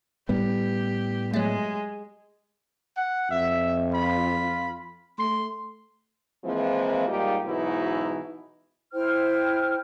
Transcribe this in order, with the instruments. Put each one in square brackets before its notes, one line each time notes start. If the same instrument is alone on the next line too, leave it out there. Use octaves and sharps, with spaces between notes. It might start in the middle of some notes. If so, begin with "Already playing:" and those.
[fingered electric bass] A2 G3 B3 [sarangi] G4
[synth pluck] F#3 A3 [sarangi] G#3
[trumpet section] F#5
[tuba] F2 [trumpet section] E5
[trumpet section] F4 B5
[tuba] A3 [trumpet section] C6
[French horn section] E3 F3 G#3 A#3 C4
G#2 G3 A#3 D#4 F4 G4
G#2 B2 E3 F#3 D#4 E4
[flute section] E4 C5 G5 F6